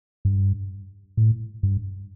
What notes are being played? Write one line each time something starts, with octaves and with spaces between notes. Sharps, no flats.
G2
A2
G2